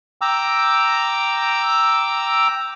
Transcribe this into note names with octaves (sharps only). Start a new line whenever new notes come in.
G5 A#5 D6 E6